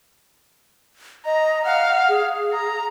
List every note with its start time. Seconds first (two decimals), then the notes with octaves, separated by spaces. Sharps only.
1.26 D#5 A#5
1.65 F5 F#5
2.09 G#4
2.53 A#5